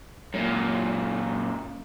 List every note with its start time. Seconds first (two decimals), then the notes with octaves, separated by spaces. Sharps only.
0.34 F#2 A#2